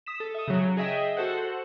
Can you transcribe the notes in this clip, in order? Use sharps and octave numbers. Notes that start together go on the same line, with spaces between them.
D#6 B6 E7
A4
E5 D#6
C#3 F#3
G#4 D#5 E5 G5
F#4 A4 C5 F#5